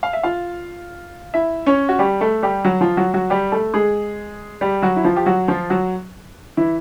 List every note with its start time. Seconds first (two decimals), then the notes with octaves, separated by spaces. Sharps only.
0.03 F5
0.13 E5
0.23 F4 F5
1.34 E4 E5
1.66 C#4 C#5
1.89 F#4
1.99 G3 G4
2.21 A3 A4
2.43 G3 G4
2.65 F#3 F#4
2.81 F3 F4
2.97 F#3 F#4
3.14 F#3 F#4
3.30 G3 G4
3.52 A3 A4
3.74 G#3 G#4
4.61 G3 G4
4.82 F#3 F#4
4.96 E4
5.04 F3 F4
5.16 G4
5.26 F#3 F#4
5.48 F3 F4
5.70 F#3 F#4
6.57 E3 E4